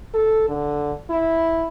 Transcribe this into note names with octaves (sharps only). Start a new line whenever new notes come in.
A4
D3
E4